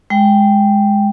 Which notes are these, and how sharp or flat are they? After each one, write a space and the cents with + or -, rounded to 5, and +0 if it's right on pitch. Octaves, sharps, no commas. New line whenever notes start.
G#3 +0 G5 +0